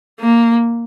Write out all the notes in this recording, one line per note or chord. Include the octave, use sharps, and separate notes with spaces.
A#3